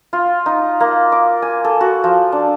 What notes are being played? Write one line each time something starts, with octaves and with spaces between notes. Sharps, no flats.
F4
D#4
A#3
D6
G#5
A4
F#4
F3
D4